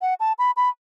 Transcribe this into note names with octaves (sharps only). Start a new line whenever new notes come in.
F#5
A5
B5
B5